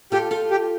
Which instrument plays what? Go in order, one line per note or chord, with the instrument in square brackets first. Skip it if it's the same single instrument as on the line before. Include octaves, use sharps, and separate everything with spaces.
[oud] F4 A4 [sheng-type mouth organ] G4
[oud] F4 A4
[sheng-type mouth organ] G4